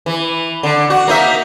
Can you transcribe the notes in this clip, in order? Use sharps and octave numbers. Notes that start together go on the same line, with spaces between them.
E3
D3
F#4
A#3 D#4 E5